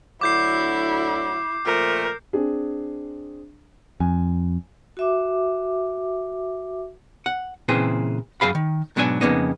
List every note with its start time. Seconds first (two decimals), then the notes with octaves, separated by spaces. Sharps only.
0.21 D2 D3 F#3 E4 D6 G6 C7
1.65 A#2 F3 A3 A#4
2.33 C4 D4 G#4
4.00 F2 G#5
4.97 F#4 E5 D6
7.26 F#5
7.68 A#2 C#3 E3 C4 G#4
8.41 F#2 G#4 F5 B5
8.55 D#3
8.96 G#2 B2 F#3 D4 F4 G#5
9.21 F2 C#3 A#3 B3 D#4